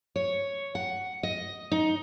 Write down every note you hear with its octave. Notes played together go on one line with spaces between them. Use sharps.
C#5
F#5
D#5
D#4